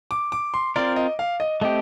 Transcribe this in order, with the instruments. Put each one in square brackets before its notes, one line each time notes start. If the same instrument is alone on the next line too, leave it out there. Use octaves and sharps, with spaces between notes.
[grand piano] D6
D6
C6
[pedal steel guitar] C4 F4 A#4 [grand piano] D5
[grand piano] D#5
F5
D#5
[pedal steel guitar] A3 C4 G4 [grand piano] D#5